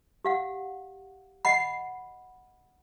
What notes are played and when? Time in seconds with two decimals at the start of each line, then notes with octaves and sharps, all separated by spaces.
0.25 G4 F5 F#5
1.45 D#5 F#5 B5 C7